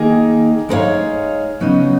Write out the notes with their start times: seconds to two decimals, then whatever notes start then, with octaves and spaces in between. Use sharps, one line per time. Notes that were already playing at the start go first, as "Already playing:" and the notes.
Already playing: D#3 A#3 D#4 G#4
0.69 G#3 D#4 A#4 C#5 F5
1.60 C#3 F#3 B3 D#4